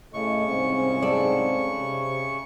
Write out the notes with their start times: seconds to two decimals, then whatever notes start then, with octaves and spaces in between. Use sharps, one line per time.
0.14 A2 C#3 A3 D#5 C#6
0.48 C2 G#2 C4
1.02 A4 D5
1.80 C3